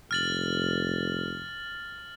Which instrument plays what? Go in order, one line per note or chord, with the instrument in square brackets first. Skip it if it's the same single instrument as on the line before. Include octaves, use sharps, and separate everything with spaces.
[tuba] F1 [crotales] F6 A6 F#7